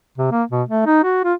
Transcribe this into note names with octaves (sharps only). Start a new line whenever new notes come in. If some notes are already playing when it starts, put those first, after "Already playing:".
C3
A#3
B2
A3
D#4
F#4
F4